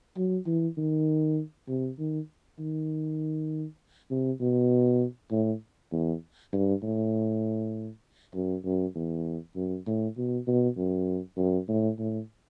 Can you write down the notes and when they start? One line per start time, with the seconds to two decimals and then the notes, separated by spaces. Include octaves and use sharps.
0.17 F#3
0.47 E3
0.77 D#3
1.68 C3
1.99 D#3
2.59 D#3
4.11 C3
4.41 B2
5.32 A2
5.92 E2
6.53 G2
6.83 A2
8.35 F#2
8.65 F#2
8.95 E2
9.56 F#2
9.86 A2
10.17 B2
10.47 B2
10.77 F#2
11.38 F#2
11.68 A2
11.99 A2